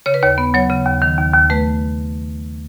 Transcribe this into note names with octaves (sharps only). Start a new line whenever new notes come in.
C#3 C#5
B4
D#2 C#5
B3
F#3 C#5
C#3
D#2
D#3
D#2
D#2
A3 B4